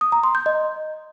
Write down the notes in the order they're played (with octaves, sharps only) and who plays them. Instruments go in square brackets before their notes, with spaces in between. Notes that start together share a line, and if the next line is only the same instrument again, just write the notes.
[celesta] D#6
A#5
C6
G6
D#5